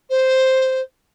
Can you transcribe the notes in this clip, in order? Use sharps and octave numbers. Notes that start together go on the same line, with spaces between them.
C5